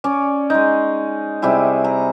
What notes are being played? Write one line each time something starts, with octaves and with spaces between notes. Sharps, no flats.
C#4 D5
G#3 D#4
C3 G3 E4 G#4
A#5